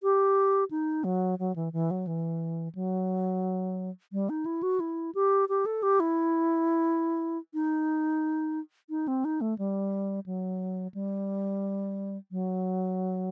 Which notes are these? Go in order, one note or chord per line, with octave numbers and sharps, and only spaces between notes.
G4
D#4
F#3
F#3
E3
E3
F#3
E3
F#3
G3
D#4
E4
F#4
E4
G4
G4
A4
G4
E4
D#4
D#4
C4
D#4
A3
G3
F#3
G3
F#3